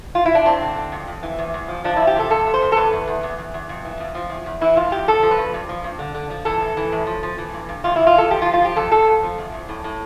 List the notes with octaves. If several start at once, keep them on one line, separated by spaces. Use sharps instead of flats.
F4
E4
D4
G2 C4
D3
D3
F2
F2
E3
E2
E2
F3
F3 D4
E2 E4
G4
C3 A4
F2 A4
C3
C5
F2
A4
E2 B4
E2
E2
E2
E2
E2
F2
E3
F2
F3
E2
E2
E3 E4
F2 F4
F2 G4
F3 A4
F3
B4
G2
G2
F3
G2
D3
D3
F3
E3 A4
A2
E3
A2
F3
F3
E3
G2
G2
E2 F4
E2 E4
F4
E2 A4
F3 G4
F4
F3
F4
F3 G4
F2 A4
F2 A4
F2
F3
E2
E2
A2
A2